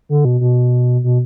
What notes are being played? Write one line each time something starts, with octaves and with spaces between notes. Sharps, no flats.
D3
B2
B2
B2